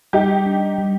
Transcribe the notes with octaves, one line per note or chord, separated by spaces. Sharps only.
G3 D#4 G4
D4
G3